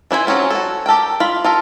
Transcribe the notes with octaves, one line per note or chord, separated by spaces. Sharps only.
E3 D4 E4 C5 G#5
F#3 C4 C#4 F4
F#4 A4
G4 A4 A#4 G5
F4 B5
F4 A4 A#4